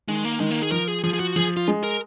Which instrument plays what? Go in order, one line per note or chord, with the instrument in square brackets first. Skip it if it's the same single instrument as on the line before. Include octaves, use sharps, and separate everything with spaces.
[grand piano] D#3 [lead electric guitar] G#3
[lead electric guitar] A#3
[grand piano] D#3 [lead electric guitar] G#3
[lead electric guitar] A#3
G#4
[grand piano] F3 [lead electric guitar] A#4
[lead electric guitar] G#4
[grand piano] F3 [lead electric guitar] G#4
[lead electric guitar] G#4
F#4
[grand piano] F3 [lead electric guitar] G#4
[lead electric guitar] F4
[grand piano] G#3
[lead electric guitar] A#4